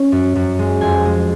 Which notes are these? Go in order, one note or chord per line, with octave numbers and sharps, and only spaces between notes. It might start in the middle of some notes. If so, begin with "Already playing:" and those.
Already playing: C#4
F#2
F#2
G#3
F2 G#5
G#3